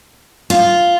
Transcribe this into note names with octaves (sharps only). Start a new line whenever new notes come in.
F4